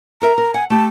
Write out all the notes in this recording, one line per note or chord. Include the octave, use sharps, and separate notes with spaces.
A4 A#4 E5 A#5
A#4
F#5 G#5
A3 G4 A5